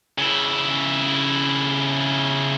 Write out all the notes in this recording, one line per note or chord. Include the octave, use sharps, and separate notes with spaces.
C#3 E4